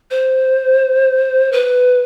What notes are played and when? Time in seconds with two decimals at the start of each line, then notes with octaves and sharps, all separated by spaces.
0.11 C5
1.52 B4